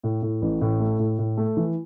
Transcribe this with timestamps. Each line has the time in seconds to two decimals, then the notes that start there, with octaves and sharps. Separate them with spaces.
0.04 A2
0.22 A2
0.42 A1
0.61 A2
0.80 A3
0.99 A2
1.18 A2
1.37 A3
1.57 E3